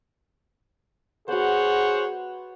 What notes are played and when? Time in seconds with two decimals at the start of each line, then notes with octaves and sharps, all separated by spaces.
1.28 B3 F#4 G#4 C5 C#5 F#5